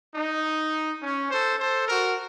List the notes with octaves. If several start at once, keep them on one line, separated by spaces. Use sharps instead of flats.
D#4
C#4
A4 C5
A4 C5
F#4 A#4